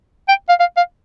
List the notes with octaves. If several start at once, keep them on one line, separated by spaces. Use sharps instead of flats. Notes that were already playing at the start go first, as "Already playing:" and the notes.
G5
F5
F5
F5